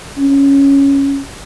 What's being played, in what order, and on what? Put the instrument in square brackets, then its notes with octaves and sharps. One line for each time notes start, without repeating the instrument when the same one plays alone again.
[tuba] C#4